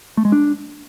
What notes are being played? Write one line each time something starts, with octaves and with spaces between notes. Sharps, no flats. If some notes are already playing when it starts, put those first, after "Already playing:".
A3
G#3
D4